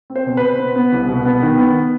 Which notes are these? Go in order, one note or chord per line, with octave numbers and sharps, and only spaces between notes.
C4
C5
B2
B4
B2
B3
B3
C2
B2
B3
D#3
B3